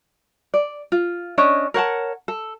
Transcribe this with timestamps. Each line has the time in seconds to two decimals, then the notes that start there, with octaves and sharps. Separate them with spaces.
0.54 D5
0.92 F4
1.38 C#4 D4 C#5 D#5
1.74 A#4 C#5 F#5 A5
2.28 A4